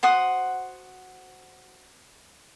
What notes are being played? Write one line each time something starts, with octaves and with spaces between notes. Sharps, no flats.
F#4 C5 F#5 D#6